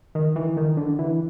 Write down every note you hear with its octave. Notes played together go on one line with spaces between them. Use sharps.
D#3
E3
D#3
D3
E3